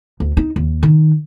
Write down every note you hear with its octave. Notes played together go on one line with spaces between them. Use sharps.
D2
D#4
D#2
D#3